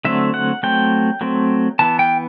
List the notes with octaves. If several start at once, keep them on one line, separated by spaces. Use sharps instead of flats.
D3 F#3 A3 C4 E5
F#5
F#3 A3 C4 G5
F#3 A3 C4
E3 B3 A5
G5